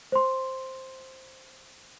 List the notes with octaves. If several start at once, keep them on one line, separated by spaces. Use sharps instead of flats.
C5 C6